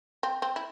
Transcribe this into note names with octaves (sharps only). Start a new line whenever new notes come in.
C4
C4
E4